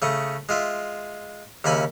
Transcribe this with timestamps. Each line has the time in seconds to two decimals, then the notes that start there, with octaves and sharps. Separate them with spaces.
0.02 C#3 A3 C#6 D#6
0.49 G#3 F4 E5
1.64 D#2 C#3 C#5 E5 G#5 B5